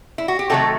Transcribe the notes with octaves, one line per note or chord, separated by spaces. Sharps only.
E4
F#4
G4
C3 D#3 F#3 A3 F#4 A4